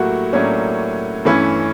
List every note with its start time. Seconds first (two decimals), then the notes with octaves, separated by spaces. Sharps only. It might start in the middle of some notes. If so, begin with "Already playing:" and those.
Already playing: A2 F#3 A#3 F#4 G4 F#5
0.33 A2 F#3 A#3 C#4 D4 C#5
1.25 G2 E3 A3 C#4 E4